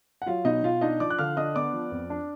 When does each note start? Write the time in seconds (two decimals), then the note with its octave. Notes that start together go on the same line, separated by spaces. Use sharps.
0.22 F#5
0.26 F#3 F4 F5
0.45 B2 D#4 D#5
0.63 B2 F4 F5
0.81 D4 D#4 D#5
1.00 F3 D5 D6
1.10 F#6
1.18 D3 F5 F6
1.37 D4 D#5 D#6
1.55 B3 D5 D6
1.73 F3
1.91 F2
2.10 D4